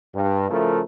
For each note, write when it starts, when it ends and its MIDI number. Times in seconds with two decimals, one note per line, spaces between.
0.14 0.50 43
0.50 0.81 49
0.50 0.81 53
0.50 0.81 57
0.50 0.81 64
0.50 0.81 69
0.50 0.81 70